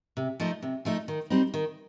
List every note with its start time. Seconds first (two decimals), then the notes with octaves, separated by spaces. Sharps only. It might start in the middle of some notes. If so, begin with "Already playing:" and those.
0.17 C3
0.40 F3 A3 D#4
0.62 C3
0.85 F3 A3 D#4
1.08 D#3
1.30 G3 C4 D#4
1.54 D#3